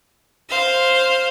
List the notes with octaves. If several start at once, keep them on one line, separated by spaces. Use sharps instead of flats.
C5 F5